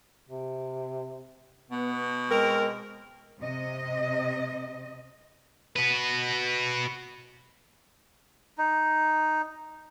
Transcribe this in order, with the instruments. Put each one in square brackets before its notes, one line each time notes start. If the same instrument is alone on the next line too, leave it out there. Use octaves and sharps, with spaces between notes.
[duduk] C3
[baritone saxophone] B2 [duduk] B3
[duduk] G#3 [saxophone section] C4 A#4
[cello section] C3 D#5
[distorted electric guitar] F#4 B4
[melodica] D#4